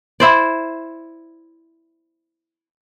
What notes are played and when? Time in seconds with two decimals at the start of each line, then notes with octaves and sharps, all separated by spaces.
0.20 E4 C5 D5